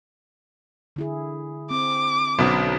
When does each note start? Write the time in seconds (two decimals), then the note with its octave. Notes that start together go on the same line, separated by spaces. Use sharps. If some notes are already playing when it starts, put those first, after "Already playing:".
0.96 D3 E4 G#4
1.71 C4 D6
2.39 B1 B2 D3 C#4 C5